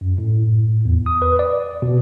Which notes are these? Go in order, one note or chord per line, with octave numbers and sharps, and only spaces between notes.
F#2
A2
E2
D#6
B4
D5
B2